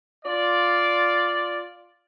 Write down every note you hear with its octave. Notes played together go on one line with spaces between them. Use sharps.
F4 D5